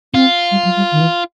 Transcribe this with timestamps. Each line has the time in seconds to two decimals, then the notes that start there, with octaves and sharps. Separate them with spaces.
0.14 C4 F4
0.51 G3
0.64 F#3
0.77 G3
0.92 D#3
1.01 E3